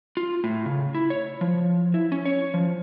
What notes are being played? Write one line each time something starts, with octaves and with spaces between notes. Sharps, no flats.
F4
A2
C#3
E4
C#5
F3
E4
C#4
C#5
F3